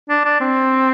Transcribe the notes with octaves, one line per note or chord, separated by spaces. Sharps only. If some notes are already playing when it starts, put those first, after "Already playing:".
D4
D4
C4